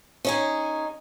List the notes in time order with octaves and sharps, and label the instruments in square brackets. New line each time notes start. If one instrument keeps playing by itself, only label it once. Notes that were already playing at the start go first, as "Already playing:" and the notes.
[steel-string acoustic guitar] C#4 D#4 G#4